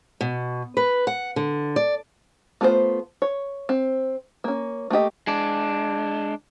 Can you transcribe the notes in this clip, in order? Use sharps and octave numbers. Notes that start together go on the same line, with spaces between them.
B2
B4
F#5
D3
D5
A3 B3 F4 A4 C5
C#5
C4
A#3 C#4
A3 A#3 G4 D#5
G#3 D4